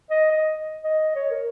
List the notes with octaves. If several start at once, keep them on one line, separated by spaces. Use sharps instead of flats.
D#5
D#5
D#5
C#5
A#4